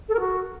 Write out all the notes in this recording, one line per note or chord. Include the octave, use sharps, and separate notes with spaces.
A4
A#4
F#4